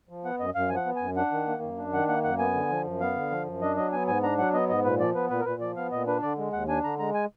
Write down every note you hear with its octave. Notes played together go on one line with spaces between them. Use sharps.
F3
B3 F#5
F#2 D#5
F#2 F5
F3 G#5
F#5
B3
F#2 G#5
D4 F#5
D#3
A#3
F#2
D4
D#3 F#5
A#3 F#5
F#2 F#5
B3 G#5
D3
F3
F#2
B3 F5
D3
F3
F#2
D4 D#5
F#3 D#5
B3 G#5
G#2 G#5
D4 A#5
F#3 F#5
B3 D#5
G#2 D#5
A#2 B4
F3 D5
B3 B4
A#2 B4
A#4
A#2 B4
F3 D5
B3 F5
A#2 D#5
D4 B4
D3 D5
G#3
D#2 F#5
D4 G#5
D3 A#5
G#3 A#5
G#5